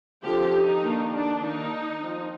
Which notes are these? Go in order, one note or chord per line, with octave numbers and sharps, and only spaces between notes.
D3 F3 C4 G4
D#4
D#3 A#3 D4
D4
D#3 A#3 D4 D#4
F3 C4